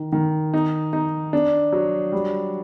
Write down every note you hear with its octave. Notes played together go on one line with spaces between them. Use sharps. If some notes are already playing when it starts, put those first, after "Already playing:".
Already playing: D#3
D#3
D#4
D#4
D4
F#3
G3